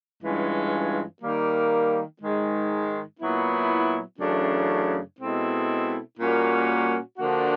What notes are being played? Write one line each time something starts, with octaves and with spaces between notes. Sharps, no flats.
G2 E3 G#3 C#4 F4
D#3 G3 A#3
G#2 D#3 G#3
A#2 F#3 B3 E4
F#2 C#3 E3 A3 D4
B2 G#3 C4 E4 A4
A#2 G3 A#3 C#4 F#4
D3 F3 A#3 D4 F#4